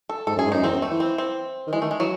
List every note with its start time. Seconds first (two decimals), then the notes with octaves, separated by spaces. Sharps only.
0.09 A4
0.27 G#2 A4
0.36 F#2 G#4
0.46 G#2
0.52 F#2 D#4
0.63 E2 C4
0.73 F#2
0.82 A3
0.91 E3
1.00 C4
1.18 C4
1.67 D#3
1.73 E3 G#3
1.82 D#3 A3
1.91 G#3
2.00 E3 F#3